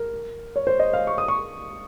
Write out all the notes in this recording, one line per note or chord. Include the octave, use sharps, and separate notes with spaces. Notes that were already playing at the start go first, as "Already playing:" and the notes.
Already playing: A#4
C#5
C5
D#5
F5
C#6
D#6
C#6